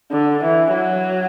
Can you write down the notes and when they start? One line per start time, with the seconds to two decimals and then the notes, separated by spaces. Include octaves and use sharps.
0.12 D3
0.44 E3
0.74 F#3